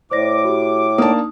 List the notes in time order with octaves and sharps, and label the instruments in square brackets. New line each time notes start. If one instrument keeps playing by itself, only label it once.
[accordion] A2 D6 [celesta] C5 D5 A#6
[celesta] F#4 G4
[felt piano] A#3 D4 A5 [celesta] D#4 D#6